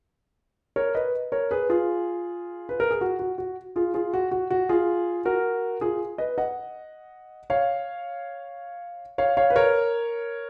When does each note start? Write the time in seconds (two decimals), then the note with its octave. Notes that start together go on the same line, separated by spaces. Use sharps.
0.76 A#4 C#5
0.95 B4 D#5
1.32 A#4 C#5
1.51 G#4 B4
1.70 F4 G#4
2.69 B4
2.80 A#4
2.90 G#4
3.01 F#4
3.19 F#4
3.38 F#4
3.76 F4 G#4
3.94 F4 G#4
4.14 F#4
4.31 F#4
4.50 F#4
4.69 F4 G#4
5.25 F#4 A#4
5.81 F4 G#4
6.18 B4 D#5
6.38 D#5 F#5
7.50 C#5 F5
9.18 C#5 F5
9.37 C#5 F5
9.50 B4
9.56 A#4 C#5